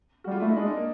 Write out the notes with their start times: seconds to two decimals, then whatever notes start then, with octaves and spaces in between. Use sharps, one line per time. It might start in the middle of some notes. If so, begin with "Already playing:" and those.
0.24 G3 F#4
0.31 F4
0.40 A3 E4
0.48 D#4
0.56 G#3 D4
0.67 D#4
0.76 A#3